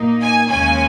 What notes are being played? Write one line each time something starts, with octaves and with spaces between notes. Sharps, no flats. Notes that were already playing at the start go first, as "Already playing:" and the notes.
Already playing: A#2 A#3 D#4
G#5
D#2 C#3 G#3 C#4 G#5